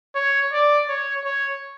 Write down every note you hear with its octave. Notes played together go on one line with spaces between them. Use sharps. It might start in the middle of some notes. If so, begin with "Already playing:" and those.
C#5
D5
C#5
C#5